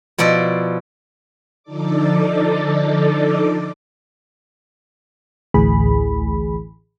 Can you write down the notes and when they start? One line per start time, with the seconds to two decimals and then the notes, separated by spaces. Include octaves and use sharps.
0.18 B2 F3 E4 D5
1.63 D3 F3 D#4 A4 D5 D6
5.54 A1 D2 A2 E3 G#4 B5